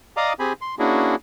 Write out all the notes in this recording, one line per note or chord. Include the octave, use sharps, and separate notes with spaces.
D5 D#5 F5 A#5 D6 D#6
C4 G4 G#4 G#5 B5
C6
A#3 C#4 D4 E4 F#4 G#4